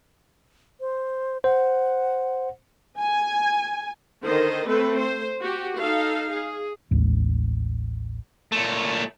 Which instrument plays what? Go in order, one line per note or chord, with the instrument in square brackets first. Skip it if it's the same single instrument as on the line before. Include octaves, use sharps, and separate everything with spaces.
[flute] C5
[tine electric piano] C5 [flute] F#5
[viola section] G#5
D3 D#3 C5 D#5
A3 C4 A4 B4
C5
F#4 G4
D#4 A4 F5
G#4
[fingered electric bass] A1 D#2 G#3
[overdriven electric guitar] A#2 A3